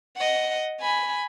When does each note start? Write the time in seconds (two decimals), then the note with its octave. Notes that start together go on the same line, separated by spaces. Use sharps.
0.17 D#5 F#5
0.81 G#5 B5